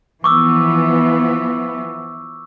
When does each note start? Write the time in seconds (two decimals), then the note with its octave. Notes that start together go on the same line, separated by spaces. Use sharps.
0.24 E3 F3 B3 C#6 D6 E6